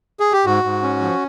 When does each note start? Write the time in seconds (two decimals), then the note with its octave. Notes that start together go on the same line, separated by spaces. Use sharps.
0.20 G#4
0.33 G4
0.46 G#2 F#4
0.64 G#2
0.83 C#4
1.01 F3